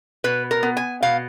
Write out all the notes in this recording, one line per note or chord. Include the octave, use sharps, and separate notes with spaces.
B2 B4
A#4
B3
G#5
B2 F5